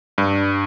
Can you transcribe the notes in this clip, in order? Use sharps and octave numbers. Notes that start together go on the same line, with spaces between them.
G2